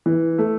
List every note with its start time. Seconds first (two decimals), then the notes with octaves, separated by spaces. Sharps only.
0.06 E3
0.38 A3